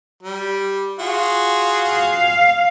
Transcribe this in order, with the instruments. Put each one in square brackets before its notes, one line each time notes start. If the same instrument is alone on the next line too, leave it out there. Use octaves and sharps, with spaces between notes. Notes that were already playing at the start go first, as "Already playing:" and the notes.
[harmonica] G3
F4 F#4 G#4
[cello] F5